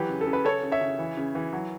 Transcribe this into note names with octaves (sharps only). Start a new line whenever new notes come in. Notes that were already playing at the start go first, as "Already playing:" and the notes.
Already playing: E3 F#3 G4 B4
C#3
A4
C#3
B4
C#3 A4 C#5
C#3
C#5 E5
C#3
E3
C#3
E3
F#3